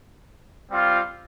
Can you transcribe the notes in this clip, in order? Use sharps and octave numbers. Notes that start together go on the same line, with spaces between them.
G3 C4 F4